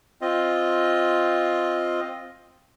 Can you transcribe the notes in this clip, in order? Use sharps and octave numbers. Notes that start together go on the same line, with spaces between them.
C4 F4 D#5